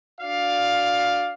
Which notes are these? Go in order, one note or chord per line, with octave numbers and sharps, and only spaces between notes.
D4 F#4 D5 F5